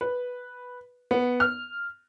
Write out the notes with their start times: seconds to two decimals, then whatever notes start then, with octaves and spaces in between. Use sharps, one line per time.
0.01 B4
1.11 B3
1.40 F6